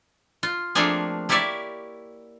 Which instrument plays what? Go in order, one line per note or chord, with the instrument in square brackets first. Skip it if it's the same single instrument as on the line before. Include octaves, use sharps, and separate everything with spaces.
[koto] F4
F3 A3 A#3 C4 D4 G#4
A#3 E4 G4 C#5 D5 E5